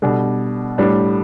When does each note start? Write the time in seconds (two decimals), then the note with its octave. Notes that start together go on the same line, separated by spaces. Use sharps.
0.02 B2 G3 D4 A4
0.78 A2 G3 D4